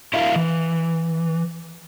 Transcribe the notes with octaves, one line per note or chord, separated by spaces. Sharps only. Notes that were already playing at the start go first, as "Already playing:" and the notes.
E4 G4 A#4 E5 F5
E3